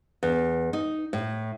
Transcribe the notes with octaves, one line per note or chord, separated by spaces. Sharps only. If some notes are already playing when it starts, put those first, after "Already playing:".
E2
D#4
A2